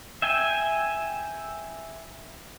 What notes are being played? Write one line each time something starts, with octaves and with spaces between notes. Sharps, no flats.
E5 G5 G#5